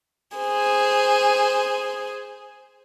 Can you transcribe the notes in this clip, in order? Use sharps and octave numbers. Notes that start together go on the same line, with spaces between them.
G#4 C5